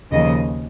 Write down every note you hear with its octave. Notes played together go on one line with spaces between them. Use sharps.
D#2 C#3 F3 D#5